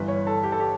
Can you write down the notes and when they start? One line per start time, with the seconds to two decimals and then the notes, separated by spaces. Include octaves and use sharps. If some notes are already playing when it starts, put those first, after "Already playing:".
Already playing: G1 G2 E3 B4
0.08 C#5
0.27 A4
0.43 G4
0.52 A4
0.60 G4